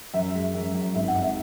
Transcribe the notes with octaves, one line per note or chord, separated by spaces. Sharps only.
F#2 E5
G#3
F#2
F#2
G#1 E5
F#5
G#1
E5